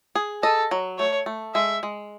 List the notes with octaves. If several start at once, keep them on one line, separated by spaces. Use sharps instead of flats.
G#4
A4 D#5
F#3
A3 C#5
A3
G#3 E5
G#3